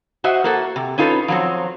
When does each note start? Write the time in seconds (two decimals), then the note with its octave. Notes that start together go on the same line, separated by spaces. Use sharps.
0.24 F#4 C5 D#5 E5 F#5
0.44 A#3 F#4 A4
0.76 C3
0.98 C#4 D#4 F4 A4 B4
1.28 F3 F#3 C4